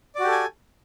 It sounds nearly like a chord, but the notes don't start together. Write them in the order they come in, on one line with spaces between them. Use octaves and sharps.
D5 F#4 G4 A4 G#5